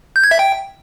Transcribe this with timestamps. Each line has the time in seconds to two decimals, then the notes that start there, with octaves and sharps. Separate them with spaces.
0.16 G6
0.24 G#6
0.31 E5
0.39 G5